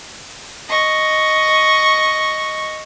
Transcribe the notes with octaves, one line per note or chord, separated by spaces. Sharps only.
D#5 C#6